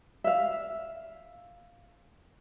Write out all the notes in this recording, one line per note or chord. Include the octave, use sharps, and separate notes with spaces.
E5 F5